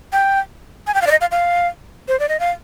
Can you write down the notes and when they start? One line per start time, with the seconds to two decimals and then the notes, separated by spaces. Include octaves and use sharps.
0.13 G5
0.87 G#5
0.94 G5
1.02 F5
1.07 D5
1.11 D#5
1.21 F5
1.31 F5
2.08 C5
2.20 D5
2.29 D#5
2.40 F5